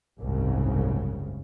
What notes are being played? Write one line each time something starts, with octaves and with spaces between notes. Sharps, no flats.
F#1 C2 G#2 C#3